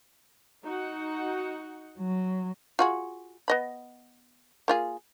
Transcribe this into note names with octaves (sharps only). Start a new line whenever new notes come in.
D#4 F#4 F#5
F#3
F4 F#4 G#4
B3 D#5 B5
A#3 F4 G#4